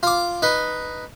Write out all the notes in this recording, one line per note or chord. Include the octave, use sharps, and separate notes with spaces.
F4 D6
D#4 B4